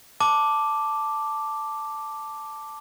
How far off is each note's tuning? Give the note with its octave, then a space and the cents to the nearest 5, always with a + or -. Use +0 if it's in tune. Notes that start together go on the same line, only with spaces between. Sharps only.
A5 +0 D6 +0